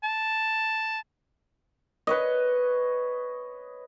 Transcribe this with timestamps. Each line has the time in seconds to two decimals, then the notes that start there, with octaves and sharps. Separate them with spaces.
0.03 A5
2.07 B4 C#5 D#5